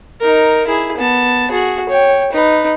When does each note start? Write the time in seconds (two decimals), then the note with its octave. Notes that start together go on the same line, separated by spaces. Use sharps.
0.21 D#4 A#4
0.67 E4 G#4
0.97 B3 A5
1.51 F#4 G#4
1.89 C#5 G5
2.33 D#4 B4